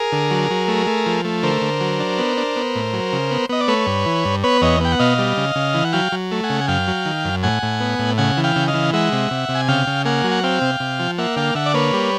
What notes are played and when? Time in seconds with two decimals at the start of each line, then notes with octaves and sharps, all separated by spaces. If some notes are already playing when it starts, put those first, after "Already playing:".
Already playing: G#4 A#4
0.12 D3
0.31 F#3
0.51 F#3
0.68 A3
0.87 A3
1.06 F3
1.25 A3
1.43 D3 A#4 C5
1.62 D3
1.81 F#3
2.00 D4
2.19 B3
2.37 D4
2.56 B3
2.75 A2
2.93 F#3
3.13 C#3
3.31 B3
3.49 B3 D#5
3.61 D5
3.68 A3 B4 C#5
3.87 G2
4.06 E3
4.25 G2
4.43 B3 B4 C#5
4.62 E2 C#5 D#5
4.80 B3 G5
4.92 F#5
4.99 B2 D#5 F5
5.19 G3
5.37 C#3
5.56 C#3
5.74 E3
5.84 F#5
5.93 F#3 F5 G5
6.12 F#3
6.32 A3
6.43 F#5 G#5
6.49 C#3
6.61 G#5
6.68 F#2 F5 G5
6.88 F#3
7.06 D#3
7.25 F#2
7.43 A2 F#5 G#5
7.63 A2
7.80 B3
7.99 A2
8.18 C#3 F#5 G#5
8.37 E3
8.44 F5 G5
8.56 C#3
8.68 D#5 F5
8.74 E3
8.93 G#3 E5 F#5
9.12 C3
9.31 C3
9.49 C3
9.55 G#5
9.68 C#3 F5 G5
9.87 C#3
10.05 A#3 F#5 G#5
10.24 F#3
10.31 F#5
10.44 C4 F5 G5
10.62 C3
10.80 C3
10.99 F3
11.18 A#3 E5 F#5
11.36 D3 F5 G5
11.55 D3 E5 F#5
11.66 D5
11.74 A#3 B4 C#5
11.93 G3